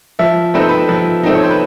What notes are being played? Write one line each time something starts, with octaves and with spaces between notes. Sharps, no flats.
F3 E5
A3 C4 D#4 B4
C5
B4
F3 B4
A3 C4 D#4
C#5
C5
B4